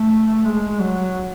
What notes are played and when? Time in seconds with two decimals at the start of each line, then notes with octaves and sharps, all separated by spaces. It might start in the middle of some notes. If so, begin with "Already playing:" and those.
Already playing: A3
0.44 G#3
0.80 F#3